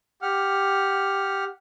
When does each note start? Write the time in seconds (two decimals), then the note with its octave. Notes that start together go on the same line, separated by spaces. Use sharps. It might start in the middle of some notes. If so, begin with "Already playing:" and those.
0.22 G4 F#5 F6